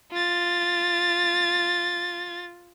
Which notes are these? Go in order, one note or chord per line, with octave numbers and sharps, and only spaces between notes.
F4 A6